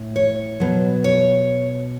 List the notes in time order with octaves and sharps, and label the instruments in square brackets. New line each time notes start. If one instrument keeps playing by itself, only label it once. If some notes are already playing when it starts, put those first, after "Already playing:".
Already playing: [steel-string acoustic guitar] A2
C#5
B2 F#3
C#5